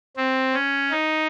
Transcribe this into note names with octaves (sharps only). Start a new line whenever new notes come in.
C4
C#4
D#4